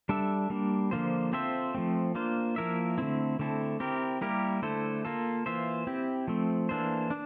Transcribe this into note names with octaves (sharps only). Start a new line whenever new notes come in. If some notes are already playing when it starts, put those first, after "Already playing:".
G3 D4 A4 E5
G3 A#3 D4
D3 F3 A#3 F4 C5
C4 F4 A4 C5 E5
F3 A3 C4
A#3 D4 F4 C5
F3 A#3 E4 A#4 E5
D3 A3 C4 E4
D3 A3 C4 E4 A4
C4 E4 G4 A#4
G3 A#3 E4 G4 A#4
D3 A3 E4 A4 C5
A#3 F4 A4
E3 A#3 F4 C5 E5
C4 E4 G4
F3 A3 C4
E3 A#3 D4 A4 C5
D4